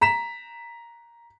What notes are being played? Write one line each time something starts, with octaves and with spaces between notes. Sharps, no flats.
A#5 B6 E7